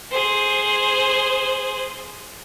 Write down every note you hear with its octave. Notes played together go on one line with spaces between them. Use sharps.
G#4 C5